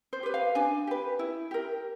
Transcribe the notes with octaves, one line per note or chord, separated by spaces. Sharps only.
C5
G4 B4
F5
D4 G#5
G4 B4
E4
G4 A#4